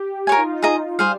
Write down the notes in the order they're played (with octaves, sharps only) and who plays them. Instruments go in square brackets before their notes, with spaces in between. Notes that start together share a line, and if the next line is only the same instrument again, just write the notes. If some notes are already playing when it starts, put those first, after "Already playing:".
Already playing: [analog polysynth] G4
[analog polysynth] F4 [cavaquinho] A#4 C#5 G#5
[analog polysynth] D#4
F4
[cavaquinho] G#4 D#5 A#5
[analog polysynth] G3 [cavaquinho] G#4 C5 F5